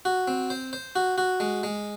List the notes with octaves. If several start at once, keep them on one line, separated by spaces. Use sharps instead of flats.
F#4
C4
C5
C5
F#4
F#4
G#3
G#3